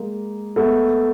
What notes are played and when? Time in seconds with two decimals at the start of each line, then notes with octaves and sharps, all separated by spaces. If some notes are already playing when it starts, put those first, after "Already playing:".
Already playing: G#3 A#3
0.56 A3 B3